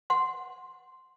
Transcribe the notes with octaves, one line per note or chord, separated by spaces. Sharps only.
F#5 C6